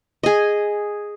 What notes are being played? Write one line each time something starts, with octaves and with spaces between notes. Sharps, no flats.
G#4 D#5